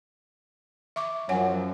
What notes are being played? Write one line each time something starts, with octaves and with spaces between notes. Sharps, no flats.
E5 C#6 D6
F#2 F3 F#3 C#5 F#5 G#5